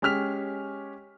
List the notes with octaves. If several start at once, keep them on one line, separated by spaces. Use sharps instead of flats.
G#3 C#4 G4 F6 B6 F7